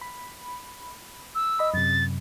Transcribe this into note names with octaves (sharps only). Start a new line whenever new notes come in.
B5
E6
D#5 B5
F#2 C3 A6